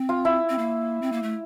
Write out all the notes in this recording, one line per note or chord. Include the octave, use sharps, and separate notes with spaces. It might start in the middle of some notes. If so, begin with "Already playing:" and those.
Already playing: C4
F4
E4
C4
A#3
C4
A#3
A3